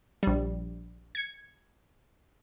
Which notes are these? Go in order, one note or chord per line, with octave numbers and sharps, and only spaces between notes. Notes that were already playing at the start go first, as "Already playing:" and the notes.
A#1 G3
G#6 C#7